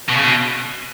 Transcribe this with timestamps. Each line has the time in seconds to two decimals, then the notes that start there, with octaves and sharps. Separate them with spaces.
0.09 B2
0.17 C#3
0.24 B2